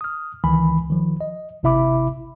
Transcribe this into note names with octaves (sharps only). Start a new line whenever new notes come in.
D#6 F6
C#2 D#3 E3 G#5 B5
D#3 F3
D#5
G#1 C3 E4 E5 B5 D6